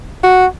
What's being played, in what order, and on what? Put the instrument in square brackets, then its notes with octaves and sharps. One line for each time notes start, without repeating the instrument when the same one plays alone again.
[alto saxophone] F#4